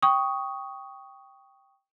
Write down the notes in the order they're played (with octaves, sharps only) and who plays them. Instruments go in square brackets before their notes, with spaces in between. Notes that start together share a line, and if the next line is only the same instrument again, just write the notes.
[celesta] G5 C#6 D#6